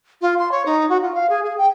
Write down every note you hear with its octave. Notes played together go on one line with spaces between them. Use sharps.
F4
C6
C#5
D#4
F#4
F4
F5
G#4
G#4
G5